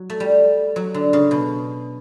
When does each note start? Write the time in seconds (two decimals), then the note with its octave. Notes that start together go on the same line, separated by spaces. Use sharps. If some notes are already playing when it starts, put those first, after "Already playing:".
Already playing: F#3
0.10 A3
0.20 G3
0.76 F#3
0.94 D3
1.13 C#3
1.31 B2